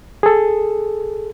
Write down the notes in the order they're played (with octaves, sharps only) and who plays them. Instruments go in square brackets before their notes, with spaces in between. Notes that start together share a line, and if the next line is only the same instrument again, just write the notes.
[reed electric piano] G#4 A4